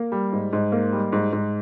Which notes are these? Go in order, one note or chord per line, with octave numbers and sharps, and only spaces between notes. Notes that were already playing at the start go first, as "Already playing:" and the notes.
Already playing: A#3
G3
G#2
G#2
A#3
G3
G#2
G#2